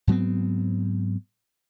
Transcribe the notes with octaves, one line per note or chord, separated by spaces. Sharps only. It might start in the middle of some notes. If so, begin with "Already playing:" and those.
G#2 F#3 B3 C4